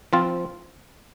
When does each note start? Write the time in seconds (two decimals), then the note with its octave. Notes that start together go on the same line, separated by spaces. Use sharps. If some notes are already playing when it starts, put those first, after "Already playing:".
0.13 F3 C4 F4